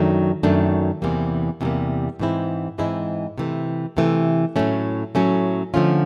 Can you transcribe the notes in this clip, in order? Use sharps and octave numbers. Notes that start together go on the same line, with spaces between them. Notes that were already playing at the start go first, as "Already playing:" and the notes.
Already playing: F#2 D#3 F#3 A3 D4
F#2 D#3 F#3 A3 D4
E2 C3 E3 G3 A#3
E2 C3 E3 G3 A#3
G#2 E3 G#3 C4 E4
G#2 E3 G#3 C4 E4
C3 E3 A3
C3 E3 A3
A2 F#3 A3 C#4
A2 F#3 A3 C#4
D3 F3 A3 C#4 F4